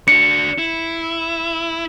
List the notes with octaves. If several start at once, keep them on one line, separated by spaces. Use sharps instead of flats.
D4 F#4 C#7
E4